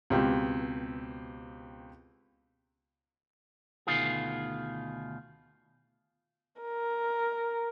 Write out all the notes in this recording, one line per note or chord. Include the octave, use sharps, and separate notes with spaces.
C#2 B2 C4 G4
D2 B2 D#3 F4 G#4
A#4